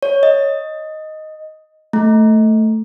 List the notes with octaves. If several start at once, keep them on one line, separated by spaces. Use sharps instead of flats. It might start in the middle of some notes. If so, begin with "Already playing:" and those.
C#5
D#5
A3